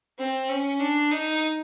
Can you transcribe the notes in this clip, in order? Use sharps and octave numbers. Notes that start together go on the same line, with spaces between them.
C4
C#4
D4
D#4